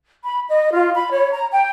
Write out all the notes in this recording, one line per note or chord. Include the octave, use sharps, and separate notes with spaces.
B5
D#5
F4
B5
C#5
A#5
G5